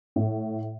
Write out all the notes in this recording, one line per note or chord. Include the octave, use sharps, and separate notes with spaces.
A2